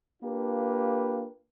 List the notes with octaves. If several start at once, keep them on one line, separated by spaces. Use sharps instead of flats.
A#3 D4 F4 G4 B4